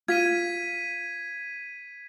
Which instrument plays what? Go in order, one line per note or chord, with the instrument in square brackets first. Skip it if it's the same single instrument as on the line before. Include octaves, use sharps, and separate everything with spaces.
[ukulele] F4 [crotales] G#6 B6 D#7